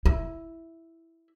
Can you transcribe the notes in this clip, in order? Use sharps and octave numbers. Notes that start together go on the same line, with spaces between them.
E4